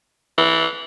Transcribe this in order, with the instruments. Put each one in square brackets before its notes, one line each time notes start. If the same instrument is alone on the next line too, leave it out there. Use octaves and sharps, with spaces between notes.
[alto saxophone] E3